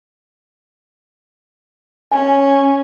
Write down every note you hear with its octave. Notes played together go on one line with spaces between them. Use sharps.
C#4 G#5